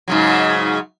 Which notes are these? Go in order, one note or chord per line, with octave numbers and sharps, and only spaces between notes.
G#2 C#3 F#3